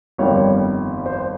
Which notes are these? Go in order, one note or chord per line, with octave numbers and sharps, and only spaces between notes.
G1 F2 D#3 G3 C#5
C5